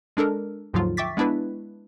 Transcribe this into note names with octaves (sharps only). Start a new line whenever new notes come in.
G#3 D4 A4 A#4
D#2 G#2 D3 F3 F#3 F4
E5 G5 C#6 D6 A6 B6
G#3 B3 D4 E4 B4